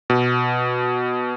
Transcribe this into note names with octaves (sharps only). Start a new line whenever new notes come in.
B2